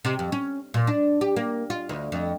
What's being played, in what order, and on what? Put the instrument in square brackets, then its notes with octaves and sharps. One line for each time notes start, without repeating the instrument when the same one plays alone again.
[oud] C3
F2
C#4
A#2
D4
G4
A#3
F4
D2
F2